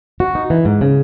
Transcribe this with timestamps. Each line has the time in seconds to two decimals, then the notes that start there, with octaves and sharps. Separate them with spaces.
0.20 F#4
0.35 D#4
0.50 E3
0.65 G#2
0.81 C#3